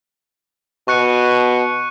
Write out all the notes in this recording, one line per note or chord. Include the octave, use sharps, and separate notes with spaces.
B2 C#6 F#6 C#7